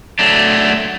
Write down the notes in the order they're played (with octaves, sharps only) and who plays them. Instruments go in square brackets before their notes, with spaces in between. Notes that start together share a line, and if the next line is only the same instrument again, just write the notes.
[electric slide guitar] F#3 A3 D4